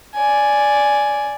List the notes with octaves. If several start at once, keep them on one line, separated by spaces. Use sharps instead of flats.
D5 G#5